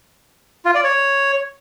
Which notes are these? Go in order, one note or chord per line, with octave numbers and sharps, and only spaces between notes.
F4
D5
C#5